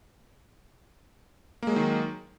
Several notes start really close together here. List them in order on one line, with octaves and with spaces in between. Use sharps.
A#3 G#3 F#3 D#3